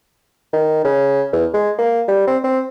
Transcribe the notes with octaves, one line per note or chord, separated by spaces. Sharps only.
D#3
C#3
E2
G#3
A#3
G3
C4
C4